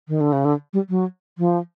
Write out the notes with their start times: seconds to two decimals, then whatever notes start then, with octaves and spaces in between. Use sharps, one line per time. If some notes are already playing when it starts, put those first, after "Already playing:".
0.08 D#3
0.21 D3
0.33 C#3
0.45 D3
0.73 G3
0.89 F#3
1.38 F3